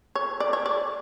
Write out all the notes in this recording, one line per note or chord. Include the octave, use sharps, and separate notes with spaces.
C#5
D5
C#5
D5